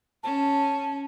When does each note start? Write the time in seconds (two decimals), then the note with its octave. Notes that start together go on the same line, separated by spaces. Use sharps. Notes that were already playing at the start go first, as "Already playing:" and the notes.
0.23 C#4 A5